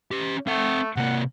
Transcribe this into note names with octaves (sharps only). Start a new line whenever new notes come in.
C#4 G4
A3 C4 F#5
C3 A#3 F#5